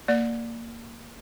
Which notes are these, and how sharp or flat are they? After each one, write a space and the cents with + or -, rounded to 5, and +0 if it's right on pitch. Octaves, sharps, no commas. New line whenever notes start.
A#3 -10 D5 +0